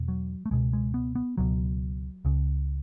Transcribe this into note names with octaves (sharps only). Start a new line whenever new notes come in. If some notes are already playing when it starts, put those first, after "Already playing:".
Already playing: E2 B2
F#3
A3
C#2 B2 G#3
G#3
B3
B3
C#2 B2 F#3
C#2 C#3